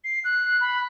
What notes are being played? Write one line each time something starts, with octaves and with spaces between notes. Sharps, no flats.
C7
F#6
B5